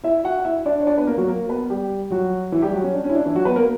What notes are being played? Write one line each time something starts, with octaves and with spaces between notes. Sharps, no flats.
E4 E5
F#4 F#5
F#5
E4 E5
D4 D5
C#5
D4 D5
B3 B4
A#3 A#4
F#3 F#4
A#3 A#4
B3 B4
G3 G4
F#3 F#4
E3 E4
G3 G4
F#3 F#4
C#4
D4
C#4
E4
D4
E3 E4
F#3 F#4
B3 B4
A#3 A#4